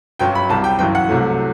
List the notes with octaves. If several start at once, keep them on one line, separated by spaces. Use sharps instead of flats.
G1 F#2 F#3 G5
B5
C2 C3 G3 A5
G5
G1 F#2 E3 G5
F#5
C2 C3 F#3 A3